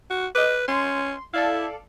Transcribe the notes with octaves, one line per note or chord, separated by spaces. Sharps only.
F#4
B4 D#5 D6
C#4 C6
E4 A4 D5 F5